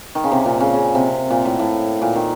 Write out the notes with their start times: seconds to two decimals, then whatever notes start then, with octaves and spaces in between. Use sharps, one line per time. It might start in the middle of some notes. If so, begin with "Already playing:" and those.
0.15 D#3
0.24 C#3
0.32 C3
0.45 A#2
0.60 C#3
0.74 C#3
0.95 C3
1.30 A#2
1.45 A2
1.59 A2
2.02 A#2
2.16 D#3